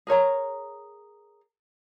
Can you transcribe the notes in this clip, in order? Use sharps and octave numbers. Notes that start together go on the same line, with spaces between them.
G#4 A#4 C#5 A#5